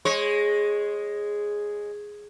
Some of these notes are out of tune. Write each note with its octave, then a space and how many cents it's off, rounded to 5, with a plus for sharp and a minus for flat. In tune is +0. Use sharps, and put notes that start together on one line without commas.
G#3 +0 C#5 -25